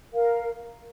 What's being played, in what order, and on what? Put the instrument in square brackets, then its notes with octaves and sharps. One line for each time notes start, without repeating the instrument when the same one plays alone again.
[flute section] A#4 F5